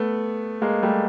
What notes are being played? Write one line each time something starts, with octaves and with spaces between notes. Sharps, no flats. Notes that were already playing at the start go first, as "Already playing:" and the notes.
Already playing: A3 B3
G#3 A#3
G3 A3